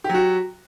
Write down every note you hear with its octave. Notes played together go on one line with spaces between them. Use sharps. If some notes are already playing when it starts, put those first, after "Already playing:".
F#3 F#4 G4